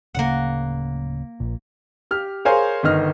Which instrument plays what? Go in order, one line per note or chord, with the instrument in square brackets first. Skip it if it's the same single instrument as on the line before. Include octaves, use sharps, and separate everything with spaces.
[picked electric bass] D1 C#3 [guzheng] A#3 F#5
[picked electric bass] A#1 A#2
[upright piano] G4 F6
G#4 A#4 C5 C#5 F5 G#5
G1 D#3 D#5 F6